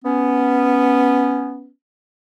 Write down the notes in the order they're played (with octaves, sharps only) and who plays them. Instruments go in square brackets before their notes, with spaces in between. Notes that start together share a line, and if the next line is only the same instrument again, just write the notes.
[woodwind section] B3 C#4